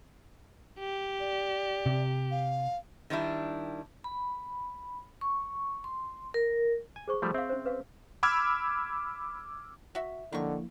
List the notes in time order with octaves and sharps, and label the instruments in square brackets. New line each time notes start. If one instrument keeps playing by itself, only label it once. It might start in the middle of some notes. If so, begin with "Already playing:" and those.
[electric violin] G4
[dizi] D5
[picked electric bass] C3
[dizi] F5
[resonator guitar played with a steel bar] D#3 G3 D4 E4
[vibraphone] B5
C#6
C6
A#4
[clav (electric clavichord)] G#5
[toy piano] G#4 C5 C#6
[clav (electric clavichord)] F3 G3 A3
[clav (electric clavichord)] C4 [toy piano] E5 F5
[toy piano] C#4 C5
B4 F5
[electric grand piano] B5 D6 E6 F6 G#6
[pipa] F#4 E5
[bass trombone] D3 [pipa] D#3 F#3 C#6 [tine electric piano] F3 A#3 E4